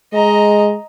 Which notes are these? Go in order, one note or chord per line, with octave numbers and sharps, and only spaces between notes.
G#3 D#5 A#5